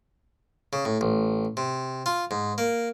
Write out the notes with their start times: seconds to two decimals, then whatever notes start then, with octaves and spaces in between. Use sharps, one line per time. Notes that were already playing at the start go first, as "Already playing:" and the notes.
0.73 C#3
0.85 A2
1.01 A1
1.57 C3
2.06 F4
2.31 G#2
2.58 A#3